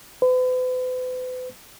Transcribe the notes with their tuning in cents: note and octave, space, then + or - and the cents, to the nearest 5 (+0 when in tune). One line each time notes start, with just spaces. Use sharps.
B4 +45